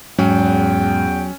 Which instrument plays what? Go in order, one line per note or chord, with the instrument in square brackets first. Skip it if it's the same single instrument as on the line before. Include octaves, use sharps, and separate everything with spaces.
[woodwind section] E2 G5 [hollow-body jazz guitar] G#2 [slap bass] F#3 [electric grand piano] C#4